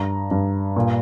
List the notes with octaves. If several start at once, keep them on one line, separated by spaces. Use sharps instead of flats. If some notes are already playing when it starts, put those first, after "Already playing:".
Already playing: G2 A#5
G2
A#2